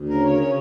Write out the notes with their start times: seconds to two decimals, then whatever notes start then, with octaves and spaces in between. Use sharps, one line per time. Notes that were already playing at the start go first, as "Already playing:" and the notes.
Already playing: D2
0.09 C#3 A#4
0.25 C#5
0.30 C#3 A#4
0.40 C#5